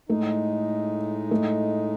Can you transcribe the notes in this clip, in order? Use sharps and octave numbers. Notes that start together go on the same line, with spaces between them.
A2 G#3 A3 D#4
A3